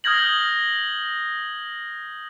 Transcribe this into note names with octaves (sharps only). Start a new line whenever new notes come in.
D#6 F6 G6 G#6 A#6 F#7